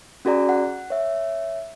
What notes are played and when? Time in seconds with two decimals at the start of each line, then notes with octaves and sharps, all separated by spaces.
0.25 C#4 F#4 G#4 D5 A#5
0.49 F#5
0.90 C#5 E5